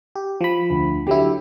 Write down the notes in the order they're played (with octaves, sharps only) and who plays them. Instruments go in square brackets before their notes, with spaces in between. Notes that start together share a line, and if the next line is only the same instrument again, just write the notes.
[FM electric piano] G4
F3 B5
[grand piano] D2
[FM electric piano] D3 F#3 E4 [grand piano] G4